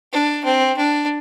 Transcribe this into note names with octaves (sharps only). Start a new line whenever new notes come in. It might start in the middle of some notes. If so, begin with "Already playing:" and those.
D4
C4
D4